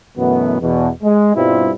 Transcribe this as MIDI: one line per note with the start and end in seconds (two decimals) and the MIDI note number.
0.17 0.57 42
0.17 0.57 47
0.17 0.57 52
0.17 0.57 57
0.17 0.57 59
0.61 0.89 40
0.61 0.89 47
1.03 1.35 56
1.35 1.71 43
1.35 1.71 47
1.35 1.71 55
1.35 1.71 60
1.35 1.71 64
1.35 1.71 65